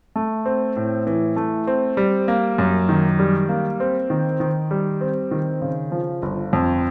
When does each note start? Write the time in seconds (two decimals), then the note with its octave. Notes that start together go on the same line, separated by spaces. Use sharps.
0.16 A3
0.46 C4
0.77 A2
1.07 E3
1.36 A3
1.67 C4
1.97 G3
2.28 A#3
2.58 F#2
2.89 D#3
3.19 G3
3.49 A#3
3.80 C4
4.10 D#3
4.40 D#3
4.71 G3
5.01 C4
5.31 D#3
5.61 C#3
5.92 F3
6.22 G1
6.53 F2